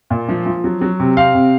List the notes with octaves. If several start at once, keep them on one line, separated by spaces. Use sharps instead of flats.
A#2
F3
F3
F#3
F#3
C3
C4 F5
C3